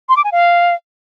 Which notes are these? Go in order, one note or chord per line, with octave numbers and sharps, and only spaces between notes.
C6
D6
G#5
F5